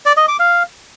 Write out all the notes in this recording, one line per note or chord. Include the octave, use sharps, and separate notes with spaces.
D5
D#5
D6
F5